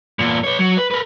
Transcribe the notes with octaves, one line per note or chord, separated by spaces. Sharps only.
E2 A#2
B4 C#5
F#3
B4
A#4 B4